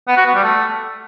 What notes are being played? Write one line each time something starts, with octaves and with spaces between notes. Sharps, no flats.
B3
F#4
B3
G3
A3